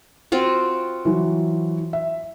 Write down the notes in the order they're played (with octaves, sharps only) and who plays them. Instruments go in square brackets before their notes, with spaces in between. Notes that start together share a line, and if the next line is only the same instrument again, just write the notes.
[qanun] C4 F4 F#4
[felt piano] E3 F#3
E5